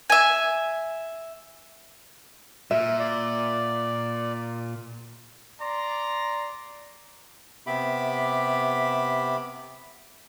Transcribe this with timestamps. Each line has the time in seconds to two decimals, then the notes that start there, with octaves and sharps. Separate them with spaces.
0.10 E5 G#5
2.71 A#2 E5
2.99 D5
5.60 D5 A#5 C6
7.67 C3 B3 G4 E5 B5 D6